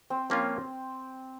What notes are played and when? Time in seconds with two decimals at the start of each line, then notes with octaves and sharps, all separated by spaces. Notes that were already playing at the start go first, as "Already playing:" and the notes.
0.10 C4
0.30 F3 A#3 C4 C#4 F4